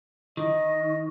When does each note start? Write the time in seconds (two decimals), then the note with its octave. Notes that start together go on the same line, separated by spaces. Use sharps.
0.37 D#3 D#5